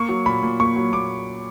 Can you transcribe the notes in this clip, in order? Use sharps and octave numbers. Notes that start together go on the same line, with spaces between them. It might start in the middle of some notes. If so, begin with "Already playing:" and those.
Already playing: A#3 C#6
F#3
A#2 B5
A#2
A#3 C#6
F#3
A#2 D6